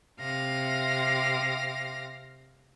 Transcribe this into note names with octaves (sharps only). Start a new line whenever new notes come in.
C3 F5 A#6